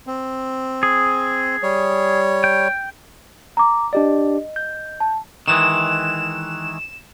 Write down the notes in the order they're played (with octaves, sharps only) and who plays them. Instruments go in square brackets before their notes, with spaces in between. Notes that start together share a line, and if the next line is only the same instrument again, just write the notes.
[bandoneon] C4
[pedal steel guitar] G#4
[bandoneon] G3 C#5
[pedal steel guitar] G5
[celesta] A#5 D6
[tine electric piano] D4 G4 D5 [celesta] D#5
[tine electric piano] G6
[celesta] A5
[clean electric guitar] D#3 E3 G#3 [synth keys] E7